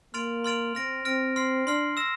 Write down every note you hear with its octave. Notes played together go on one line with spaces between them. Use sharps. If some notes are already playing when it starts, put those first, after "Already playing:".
A#3 C6 F6 A6 D7 F7
C6 F6 A6 D7 F7
C4 F6 A#6 D7
C4 F6 A#6 D7
C6 F6 C7
D4 C6 F6 C7
E6 A#6 E7